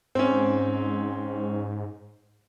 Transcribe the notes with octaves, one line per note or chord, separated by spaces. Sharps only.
G#2 C4 C#4